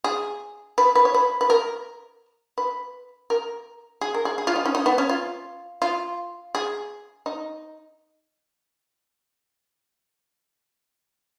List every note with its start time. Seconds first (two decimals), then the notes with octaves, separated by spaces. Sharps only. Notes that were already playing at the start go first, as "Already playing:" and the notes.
0.04 G#4
0.78 B4
0.95 B4
1.05 C#5
1.14 B4
1.41 B4
1.50 A#4
2.58 B4
3.30 A#4
4.01 G#4
4.14 A#4
4.25 G#4
4.38 G#4
4.47 F4
4.56 D#4
4.65 C#4
4.75 D#4
4.86 B3
4.98 C#4
5.09 F4
5.82 F4
6.55 G#4
7.26 D#4